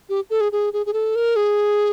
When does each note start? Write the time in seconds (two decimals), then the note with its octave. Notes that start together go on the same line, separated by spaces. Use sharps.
0.09 G4
0.30 A4
0.41 G#4
0.52 G#4
0.73 G#4
0.86 G#4
0.93 A4
1.15 A#4
1.36 G#4